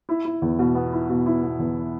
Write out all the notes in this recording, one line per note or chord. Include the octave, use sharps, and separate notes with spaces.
E4
E4
E2
B2
B3
E4
B2
E4
B2
E2